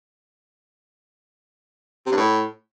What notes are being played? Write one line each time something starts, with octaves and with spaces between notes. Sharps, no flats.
C3
G2
A2